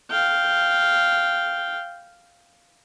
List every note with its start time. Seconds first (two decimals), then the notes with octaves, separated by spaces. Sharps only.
0.11 F5 G5